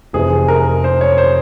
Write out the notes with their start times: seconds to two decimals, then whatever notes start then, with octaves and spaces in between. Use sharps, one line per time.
0.13 F1 F2 C3 E3 G#4
0.48 A#4
0.84 C5
1.01 C#5
1.18 C5